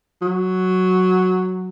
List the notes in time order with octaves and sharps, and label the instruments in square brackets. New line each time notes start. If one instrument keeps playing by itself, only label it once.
[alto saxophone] F#3